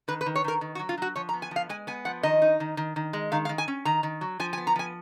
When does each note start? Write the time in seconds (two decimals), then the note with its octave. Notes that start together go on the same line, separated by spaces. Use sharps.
0.08 D#3 B4
0.21 B4
0.26 D#3
0.36 C#5
0.44 D#3 A#4
0.61 D#3
0.75 F#4
0.79 F#3
0.89 F4
0.98 F#3 F#4
1.16 F3 C#5
1.29 A#5
1.33 B3
1.42 G#5
1.51 F3 F5
1.69 G#3 G#5
1.87 B3 G#5
2.05 F3 F#5
2.23 D#3 D#5
2.42 D#4
2.60 D#3
2.77 D#3
2.96 D#3
3.13 G#3
3.32 D#3 F5
3.45 F5
3.49 D#3
3.58 G#5
3.68 C#4
3.85 D#3 A#5
4.03 D#3
4.21 F#3
4.40 F3 G#5
4.53 G#5
4.58 B3
4.67 A#5
4.76 F3 G#5